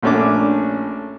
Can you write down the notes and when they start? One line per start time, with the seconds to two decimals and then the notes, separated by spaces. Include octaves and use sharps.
0.03 A#1 A3 C#4 D4 D6